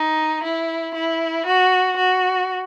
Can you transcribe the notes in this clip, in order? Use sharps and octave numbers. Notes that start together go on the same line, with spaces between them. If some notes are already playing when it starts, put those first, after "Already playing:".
Already playing: D#4
E4
E4
F#4
F#4